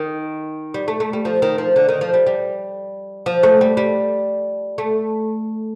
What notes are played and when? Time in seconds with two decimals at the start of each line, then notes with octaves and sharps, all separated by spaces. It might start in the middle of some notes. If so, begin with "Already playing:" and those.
Already playing: D#3
0.74 G3
0.88 A3
1.00 A3
1.13 G3
1.25 F3
1.42 D#3
1.58 F3
1.76 D3
1.88 D#3
2.01 F3
2.14 G3
2.27 G3
3.26 F3
3.43 A3
3.61 G3
3.77 G3
4.78 A3